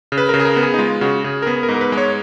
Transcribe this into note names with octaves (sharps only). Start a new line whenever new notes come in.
C#3
B4
C#3 A#4
G#4
A#4
B3
G#4
D#4
G#3 F4
C#3 F#4
C#3 G#4
A#4
B3 G#4
A#4
G#2
A#4
B4
G#3
C#5